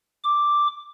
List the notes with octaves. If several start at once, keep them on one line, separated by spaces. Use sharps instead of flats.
D6